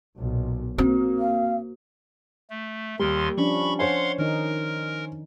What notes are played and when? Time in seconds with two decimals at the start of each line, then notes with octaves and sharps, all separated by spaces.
0.17 B1 A#2
0.78 A#3 C4 F#4
1.19 F5
2.50 A3
3.00 D#2 D#3 G3 C6
3.37 F3 C#4 D4 B5 C#6
3.79 C5 C#5 F5 F#5 G#5 C6
4.18 D#3 D#4 A#4